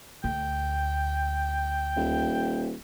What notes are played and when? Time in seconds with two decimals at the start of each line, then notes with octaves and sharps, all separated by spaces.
0.24 D2 G5
1.97 D#1